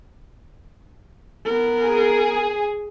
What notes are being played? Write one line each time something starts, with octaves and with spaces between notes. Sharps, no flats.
B3 A#4
G#4